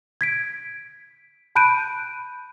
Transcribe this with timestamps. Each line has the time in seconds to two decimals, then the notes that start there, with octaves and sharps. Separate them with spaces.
0.21 G#6 B6 D7
1.55 A5 B5 F#6 G6 D7 D#7